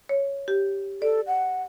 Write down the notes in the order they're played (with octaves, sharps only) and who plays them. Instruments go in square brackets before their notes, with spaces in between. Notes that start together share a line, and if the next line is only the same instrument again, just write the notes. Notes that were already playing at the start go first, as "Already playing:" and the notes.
[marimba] C#5
G4
[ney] A4 [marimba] D5
[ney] F#5